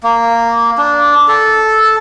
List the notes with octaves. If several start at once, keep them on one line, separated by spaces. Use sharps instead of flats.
A#3
D4
A4